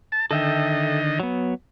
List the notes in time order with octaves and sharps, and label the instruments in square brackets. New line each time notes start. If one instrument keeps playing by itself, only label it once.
[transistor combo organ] A5
[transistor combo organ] D3 D#3 D#5 [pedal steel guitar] A4 E5 G5
[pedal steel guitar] F#3 B3